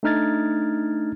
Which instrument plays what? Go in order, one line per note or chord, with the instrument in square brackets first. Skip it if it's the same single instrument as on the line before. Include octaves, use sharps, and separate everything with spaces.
[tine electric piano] A3 D4 D#4 F6 G#6 A6